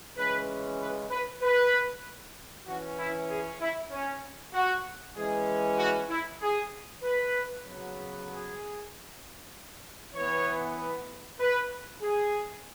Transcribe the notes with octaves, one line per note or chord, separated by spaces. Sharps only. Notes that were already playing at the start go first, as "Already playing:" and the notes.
C#3 E3 G#3 C#4 B4
B4
B4
B4
E3 C#4 F#4
E4
G#4
E4
C#4
F#4
E3 G#3 C#4 G#4
F#4
E4
G#4
B4
C#3 F#3 B3
G#4
E3 B3 C#5
B4
G#4